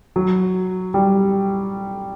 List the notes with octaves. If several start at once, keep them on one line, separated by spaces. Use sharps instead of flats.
F#3
G3